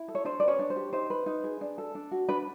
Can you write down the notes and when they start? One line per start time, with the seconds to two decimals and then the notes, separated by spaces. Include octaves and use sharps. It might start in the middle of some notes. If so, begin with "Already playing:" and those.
Already playing: E4
0.08 A4
0.15 C#5
0.25 D4 C5
0.40 D5
0.42 B4
0.48 C#4 C#5
0.59 D4
0.70 C5
0.76 G4
0.93 D#4 C5
1.10 B4
1.26 D#4
1.44 G#4
1.61 D4
1.78 A4
1.95 D4
2.11 F#4
2.29 D4 B4